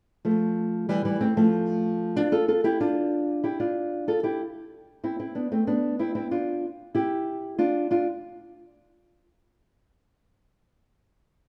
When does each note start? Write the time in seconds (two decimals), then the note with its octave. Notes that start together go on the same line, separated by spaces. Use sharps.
0.25 F3 A3
0.89 E3 G3
1.05 E3 G3
1.21 A3 C4
1.37 F3 A3
2.16 D4 F4
2.32 F4 A4
2.48 F4 A4
2.64 E4 G4
2.80 D4 F4
3.44 E4 G4
3.60 D4 F4
4.08 F4 A4
4.23 E4 G4
5.04 C4 E4
5.19 C4 E4
5.35 B3 D4
5.52 A3 C4
5.67 B3 D4
5.99 C4 E4
6.15 C4 E4
6.31 D4 F4
6.95 E4 G4
7.59 D4 F4
7.91 D4 F4